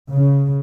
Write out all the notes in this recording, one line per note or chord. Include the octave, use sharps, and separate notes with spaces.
C#3